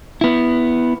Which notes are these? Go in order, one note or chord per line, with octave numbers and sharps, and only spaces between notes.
B3 E4